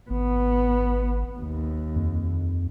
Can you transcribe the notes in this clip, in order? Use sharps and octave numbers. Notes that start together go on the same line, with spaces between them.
G#1 B3
D#2
F2